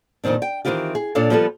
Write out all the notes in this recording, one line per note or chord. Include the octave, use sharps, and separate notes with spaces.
F2 A#2 D#3 C4 D4
G5
D#3 E3 F#3 C4 F4 G4
G#4
A#2 D4 A4 C#5 F5
F3 G3 B3 F4 A4